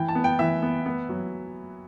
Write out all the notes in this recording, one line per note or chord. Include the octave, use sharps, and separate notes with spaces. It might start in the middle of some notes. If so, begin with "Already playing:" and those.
Already playing: E3 G5
A5
B3
G5
E3 E5
B3
B3
F#3